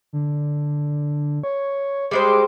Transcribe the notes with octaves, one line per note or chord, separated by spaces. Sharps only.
D3
C#5
G3 G#3 C5 D6